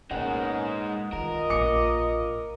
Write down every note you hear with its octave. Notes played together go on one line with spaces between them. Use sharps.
A#2 G#3 B3 C#4 D#4 A#4 F#5
D#3 F4 A#4 D#5
A#1 A#2 D6 C#7